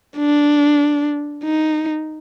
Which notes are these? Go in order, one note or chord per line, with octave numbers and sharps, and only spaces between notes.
D4
D#4